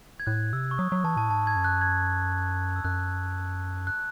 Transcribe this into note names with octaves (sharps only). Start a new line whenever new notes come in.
G#6
A2 F#6
C3 E6
C#6
F#3 D#6
F#3 C#6
E3 A5
A2 A5
G#2 A5
G#6
F#2
F#6
G#6
E6
F#2 F#6
F#6